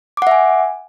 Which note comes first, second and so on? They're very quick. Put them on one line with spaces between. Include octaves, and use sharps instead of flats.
D6 F#5 E5 G#5